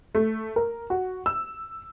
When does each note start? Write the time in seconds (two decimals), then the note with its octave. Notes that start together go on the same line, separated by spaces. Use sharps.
0.15 A3
0.56 A#4
0.90 F#4
1.26 E6